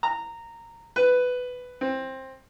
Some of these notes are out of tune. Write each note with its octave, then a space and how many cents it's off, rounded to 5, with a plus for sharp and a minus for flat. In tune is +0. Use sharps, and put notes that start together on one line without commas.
A#5 -15
B4 +10
C4 +15